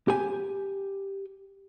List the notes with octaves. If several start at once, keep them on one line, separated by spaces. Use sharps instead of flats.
G4 G#5